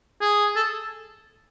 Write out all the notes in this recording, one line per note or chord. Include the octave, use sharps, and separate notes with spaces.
G#4
A4